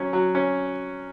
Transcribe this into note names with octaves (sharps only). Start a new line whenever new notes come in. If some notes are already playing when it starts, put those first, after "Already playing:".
Already playing: F#3 C#4
F#3
C#4